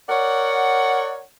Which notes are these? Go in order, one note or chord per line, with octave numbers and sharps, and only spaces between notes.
A#4 C#5 D5 F#5